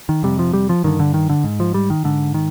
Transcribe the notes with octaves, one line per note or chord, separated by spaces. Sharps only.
D#3
F2 C3 G3
F3
G3
F3
G2 D3 D#3
D3
D#3
D3
G#2
F3
G3
D#3
G#2 D3
D#3